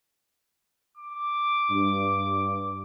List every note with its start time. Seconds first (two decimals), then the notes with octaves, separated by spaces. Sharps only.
0.97 D6
1.69 G2